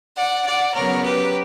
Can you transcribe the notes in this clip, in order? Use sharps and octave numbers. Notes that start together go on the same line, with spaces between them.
D5 F#5
D5 F#5
C#3 F#3 B3 A#4 C#5
G4 B4